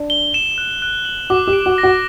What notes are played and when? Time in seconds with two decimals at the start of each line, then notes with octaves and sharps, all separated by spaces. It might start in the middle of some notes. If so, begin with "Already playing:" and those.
Already playing: D4
0.10 G7
0.34 E7
0.58 F#6
0.82 F#6
1.05 F#7
1.30 F#4 D6
1.47 G4
1.53 D7
1.66 F#4
1.78 A#6
1.83 F#4